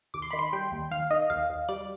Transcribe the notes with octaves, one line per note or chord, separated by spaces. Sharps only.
D#2 D6
C6
D#3 B5
C6
G3 G5
D#2
D#2 F5
D#3 D#5
D#2 F5
D#2
G3 D5